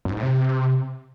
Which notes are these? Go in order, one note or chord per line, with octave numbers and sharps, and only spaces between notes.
F#2
G#2
A2
C3